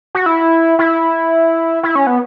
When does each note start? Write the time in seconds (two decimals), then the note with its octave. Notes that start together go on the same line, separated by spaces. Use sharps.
0.15 F#4
0.26 E4
0.79 E4
1.83 E4
1.95 C#4
2.07 B3